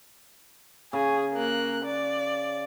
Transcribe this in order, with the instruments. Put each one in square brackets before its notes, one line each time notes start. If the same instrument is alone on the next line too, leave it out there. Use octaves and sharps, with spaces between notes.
[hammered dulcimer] C#3 [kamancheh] G#4
[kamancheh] A#3 F#6
D5